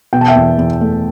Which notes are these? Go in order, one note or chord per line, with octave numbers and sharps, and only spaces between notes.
B2 G5
A5
E5 G5
E2
E2
A3